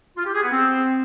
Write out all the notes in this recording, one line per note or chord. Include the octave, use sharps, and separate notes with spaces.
F4
G4
G#4
B3
C4